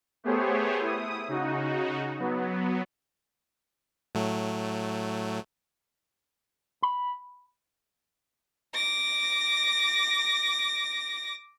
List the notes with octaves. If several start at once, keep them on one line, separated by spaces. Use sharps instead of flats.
A3 B3 G4 G#4 C5 C#5
E4 D#6
C#3 D#4 F#4
F#3 B3
A2 F#3 A3
B5
D6 A#6